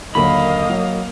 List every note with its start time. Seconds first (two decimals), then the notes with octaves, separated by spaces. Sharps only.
0.15 D#2 D3 F#3 A#3 D#5 F5 B5
0.70 F#3